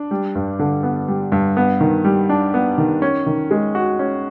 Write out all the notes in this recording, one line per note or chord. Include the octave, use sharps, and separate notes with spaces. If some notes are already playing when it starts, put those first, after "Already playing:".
Already playing: D4
G3
G2
D3
B3
G3
G2
B3
D#3
G3
D4
B3
D#3
C#4
D#3
G#3
F#4
C#4